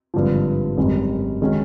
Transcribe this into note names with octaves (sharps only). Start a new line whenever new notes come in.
G#1 G2 D3 F3
G#1 F#2 D#3 G3
D#3 G#3 C#4 F#4